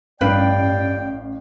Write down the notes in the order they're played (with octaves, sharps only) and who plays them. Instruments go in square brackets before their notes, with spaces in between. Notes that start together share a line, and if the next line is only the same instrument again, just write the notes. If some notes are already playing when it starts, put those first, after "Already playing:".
[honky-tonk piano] A1 F5 D7 [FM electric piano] G2 [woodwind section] G3 D5 G5 [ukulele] B4